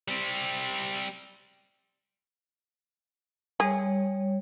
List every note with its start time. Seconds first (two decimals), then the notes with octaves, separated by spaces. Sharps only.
0.08 G3 C4
3.60 G3 G#4 C#5